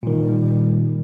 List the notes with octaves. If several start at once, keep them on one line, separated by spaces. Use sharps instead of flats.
A#2 D#3 G3